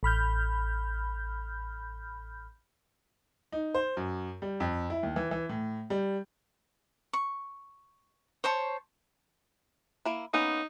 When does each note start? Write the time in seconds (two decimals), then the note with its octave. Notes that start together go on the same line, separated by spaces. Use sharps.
0.03 A1 B5 F6 G6
3.52 D#4
3.74 C5
3.97 F#2
4.42 G3
4.60 F2
4.90 E4
5.03 D#2
5.16 E3
5.31 E3
5.49 A2
5.90 G3
7.13 C#6
8.44 C5 C#5 A5 C#6
10.05 A#3 E4
10.33 A#3 B3 C#4 D#4